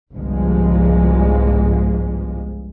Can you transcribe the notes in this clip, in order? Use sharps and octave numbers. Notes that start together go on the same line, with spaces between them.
G1 C2 G#2 F3 G#3